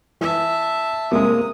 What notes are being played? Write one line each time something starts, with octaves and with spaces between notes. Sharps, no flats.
E3 E5 A5
C3 G#3 A#3 D#6